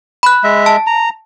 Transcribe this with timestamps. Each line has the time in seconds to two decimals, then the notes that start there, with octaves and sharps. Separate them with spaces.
0.23 B5 F#6
0.44 G#3 E5
0.66 A5
0.87 A#5